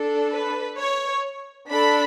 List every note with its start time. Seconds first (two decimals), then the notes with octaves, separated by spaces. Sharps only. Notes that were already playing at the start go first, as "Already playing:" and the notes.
Already playing: D4 A4
0.32 B4
0.78 C#5
1.69 D4 A4 B5